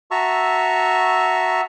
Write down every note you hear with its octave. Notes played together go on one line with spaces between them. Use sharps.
F#4 E5 A5 A#5 C#6 E6